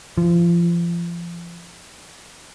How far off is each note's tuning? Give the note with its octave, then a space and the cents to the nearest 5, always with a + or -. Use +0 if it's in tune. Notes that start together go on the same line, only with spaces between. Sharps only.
F3 -30